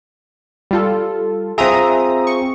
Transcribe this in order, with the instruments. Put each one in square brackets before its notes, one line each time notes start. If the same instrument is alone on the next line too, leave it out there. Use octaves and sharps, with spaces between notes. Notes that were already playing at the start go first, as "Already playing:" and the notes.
[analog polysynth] G3 F4 A4
[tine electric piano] C4 F4 G#4 [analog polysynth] E5 A#5 D#6
[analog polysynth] C#6